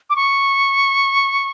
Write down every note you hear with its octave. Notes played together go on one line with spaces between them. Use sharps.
D6
C#6